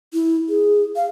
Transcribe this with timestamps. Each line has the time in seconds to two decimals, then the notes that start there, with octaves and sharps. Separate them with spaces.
0.14 E4
0.49 G#4
0.96 F5